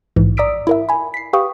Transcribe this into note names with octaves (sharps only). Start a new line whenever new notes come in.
A#1 G#2 E3
D5 A#5 D#6 E6 B6 D7
E4 A#4 E5
G#5 B5
B6 C7
G4 B4 F5 G5 C#6 D#6